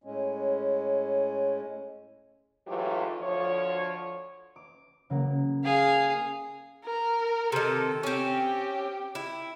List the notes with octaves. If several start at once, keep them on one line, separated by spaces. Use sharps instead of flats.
A2 G#3 C#4
G#2 E3 F#3 A3 F4 G4
D2 F3 C#5
D6
C#3 F#3 A#3
G#4 F5
A#4
C3 D#3 A4
C4 C#4 G4
E4